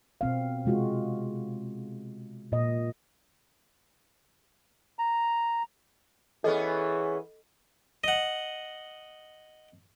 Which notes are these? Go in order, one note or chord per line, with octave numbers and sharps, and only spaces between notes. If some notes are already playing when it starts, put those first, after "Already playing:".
B2 C4 F5
C3 G#3 F4 F#4
A#2 D#5
A#5
E3 B3 C#4 G#4 A4 D#5
D#5 F#5